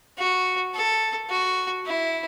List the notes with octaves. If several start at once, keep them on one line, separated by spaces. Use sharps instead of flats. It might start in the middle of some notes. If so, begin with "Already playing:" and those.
F#4
A4
F#4
E4